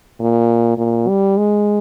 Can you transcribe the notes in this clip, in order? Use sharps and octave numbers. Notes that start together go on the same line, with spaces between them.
A#2
A#2
G3
G#3